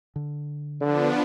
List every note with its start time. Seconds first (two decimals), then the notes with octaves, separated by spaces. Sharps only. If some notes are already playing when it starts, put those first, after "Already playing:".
0.16 D3
0.81 D3 F3 B3 D4